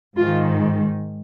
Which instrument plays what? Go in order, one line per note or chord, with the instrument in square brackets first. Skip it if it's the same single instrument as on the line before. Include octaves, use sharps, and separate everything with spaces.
[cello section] G#2 D#3 F4